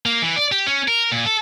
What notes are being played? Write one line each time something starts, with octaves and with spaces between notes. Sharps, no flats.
A#3
E3
D5
G4
C#4
A#4
A#2
A4